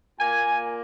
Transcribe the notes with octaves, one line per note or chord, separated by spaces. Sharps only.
A#2 A#3 G#5